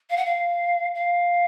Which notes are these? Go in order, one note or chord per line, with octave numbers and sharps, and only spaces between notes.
F5
F#5
F5
F5